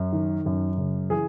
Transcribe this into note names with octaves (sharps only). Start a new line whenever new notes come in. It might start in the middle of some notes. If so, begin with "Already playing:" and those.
Already playing: F#2
D#3
F#2
C#3
E3 G#4